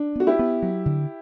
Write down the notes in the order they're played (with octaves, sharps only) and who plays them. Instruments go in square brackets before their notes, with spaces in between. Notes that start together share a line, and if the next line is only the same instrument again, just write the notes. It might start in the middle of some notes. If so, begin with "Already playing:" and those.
Already playing: [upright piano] D4
[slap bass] B3 [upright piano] F#4
[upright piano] E4 G4
[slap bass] B3
F#3
D3